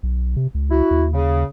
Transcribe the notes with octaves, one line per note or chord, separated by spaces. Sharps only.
B1
C3
C#2
E4 F#4
D#2
C#3